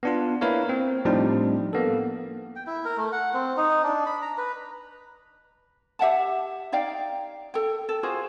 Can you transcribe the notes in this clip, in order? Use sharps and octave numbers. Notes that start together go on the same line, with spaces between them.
B3 D4 F4
A#3 E4 A#4 B4 C#5 F5
C4
A2 F3 G3 C4 D4 D#4
A#3 B3 A4
G5
E4
A#4
A3
F#5
C4
D#4
D4
B5
A#5
B4
G4 E5 F#5 A5
D#4 D5 F5 G5
A4 G5
A4
F4 F#4 G#4 C5